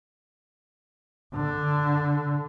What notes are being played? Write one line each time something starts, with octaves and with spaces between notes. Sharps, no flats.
D3